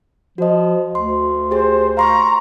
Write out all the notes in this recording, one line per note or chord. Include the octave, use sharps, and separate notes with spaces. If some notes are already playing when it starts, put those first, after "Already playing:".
F3 F#4 D#5
D2 C6
G4 G#4 C5
F5 A#5 C6 C#6